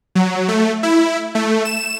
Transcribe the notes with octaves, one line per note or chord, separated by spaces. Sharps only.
F#3
A3
E4
A3
E7